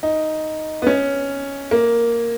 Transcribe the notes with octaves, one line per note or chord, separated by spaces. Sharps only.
D#4
B3
C#4
A#3